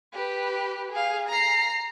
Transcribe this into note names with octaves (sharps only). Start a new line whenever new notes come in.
G4 B4
G#4 F5
A#5 C7